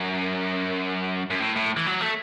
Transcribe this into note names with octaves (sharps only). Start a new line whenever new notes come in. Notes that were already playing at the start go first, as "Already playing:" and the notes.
Already playing: F#2
F#2
A2
A2
E3
F#3
A3